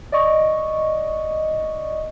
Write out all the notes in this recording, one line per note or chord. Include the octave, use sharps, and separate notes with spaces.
D5 D#5 C#6